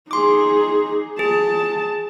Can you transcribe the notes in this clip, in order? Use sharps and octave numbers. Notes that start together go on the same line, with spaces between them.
D#4 G#4 C6 D6
G#4 A5